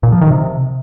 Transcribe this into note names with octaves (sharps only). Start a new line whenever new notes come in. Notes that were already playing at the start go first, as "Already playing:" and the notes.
A#2
F3
D#3
C3